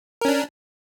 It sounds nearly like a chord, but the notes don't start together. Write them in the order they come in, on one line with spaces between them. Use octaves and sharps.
A#4 C#4 D4